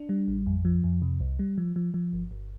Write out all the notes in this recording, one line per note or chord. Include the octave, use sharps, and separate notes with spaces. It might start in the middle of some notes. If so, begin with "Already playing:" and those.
Already playing: D4
G3
A1
F2
F3
F2
C3
C2
G3
F3
F3
F3
G1
G1